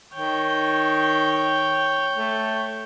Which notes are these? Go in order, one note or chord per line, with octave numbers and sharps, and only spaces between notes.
D#3 C#5 G5
A3